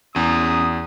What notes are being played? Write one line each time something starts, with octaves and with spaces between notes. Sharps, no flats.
E2 C#4 A#5 D#6